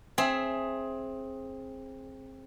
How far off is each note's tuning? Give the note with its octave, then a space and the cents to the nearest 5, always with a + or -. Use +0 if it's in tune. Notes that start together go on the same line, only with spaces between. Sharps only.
C4 +20 G#4 +10 E5 +0